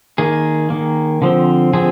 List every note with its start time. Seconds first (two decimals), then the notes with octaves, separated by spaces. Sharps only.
0.18 D#3 A#3 G#4
0.70 D#3 A#3
1.22 D3 F3 C4
1.73 D3 F3 C4 G#4